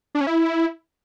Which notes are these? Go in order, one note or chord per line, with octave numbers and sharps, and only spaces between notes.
D4
C#4
E4